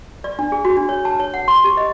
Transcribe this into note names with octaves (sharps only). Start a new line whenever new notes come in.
D5
D4
G#4
F#4
D4
C#5
A5
C#5
F#5
C6
G4
D#5